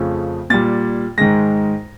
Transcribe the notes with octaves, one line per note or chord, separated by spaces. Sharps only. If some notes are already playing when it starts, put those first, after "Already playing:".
Already playing: F2 C#3 F3 A3
A#2 G3 A6
G#2 D#3 G#3 A#6